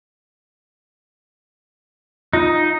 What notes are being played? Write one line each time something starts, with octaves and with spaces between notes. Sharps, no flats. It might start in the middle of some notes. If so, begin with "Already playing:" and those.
D#4 F4